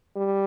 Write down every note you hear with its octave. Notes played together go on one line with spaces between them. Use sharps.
G3